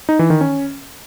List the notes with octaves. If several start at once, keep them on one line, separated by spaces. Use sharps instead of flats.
D#4
E3
D#3
C#4